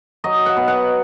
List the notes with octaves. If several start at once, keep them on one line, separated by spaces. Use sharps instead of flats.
F#3 D#5
F#5
B2
F#5